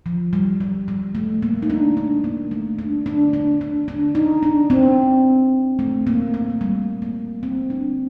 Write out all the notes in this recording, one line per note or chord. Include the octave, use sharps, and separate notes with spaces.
F3
G3
G3
G3
A3
A#3
D#4
D4
D4
A#3
A3
D4
D4
D4
D4
D4
D#4
D4
C4
A3
A#3
A#3
A3
G3
A#3
C4
D4